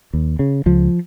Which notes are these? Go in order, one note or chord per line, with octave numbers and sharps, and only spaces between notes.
D#2
C#3
C#2 F3